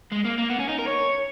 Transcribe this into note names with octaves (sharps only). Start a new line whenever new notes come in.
G#3
A#3
A#3
B3
C#4
D#4
A#4
C#5